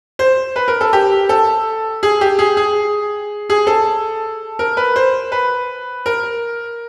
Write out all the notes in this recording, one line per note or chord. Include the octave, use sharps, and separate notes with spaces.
C5
B4
A#4
A4
G4
A4
G#4
G4
G#4
G#4
G#4
A4
A#4
B4
C5
B4
A#4